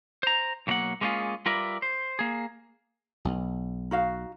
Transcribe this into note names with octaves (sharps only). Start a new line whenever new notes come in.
C5 A#5
B1 C#3 F#3 A#3 F#5
G#3 A#3 C#4 D4 F4 G#4
G3 F4 A#4 B4 D5 E5
C5
A#3 G#4
B1
D#4 F#4 F5